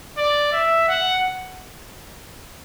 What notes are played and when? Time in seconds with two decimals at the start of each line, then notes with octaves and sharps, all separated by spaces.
0.17 D5
0.53 E5
0.88 F#5